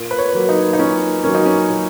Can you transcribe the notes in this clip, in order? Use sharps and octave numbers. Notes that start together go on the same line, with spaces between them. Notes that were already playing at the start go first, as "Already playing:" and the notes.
Already playing: A#2
B4
C#5
F#3 A#3
D#4
D#4
A#2 C#4
F#3 A#3 C#4
D#4
C#4
A#2